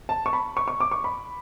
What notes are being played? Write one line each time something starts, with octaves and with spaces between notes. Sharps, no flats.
A5
C#6
B5
C#6
C#6
D6
C#6
B5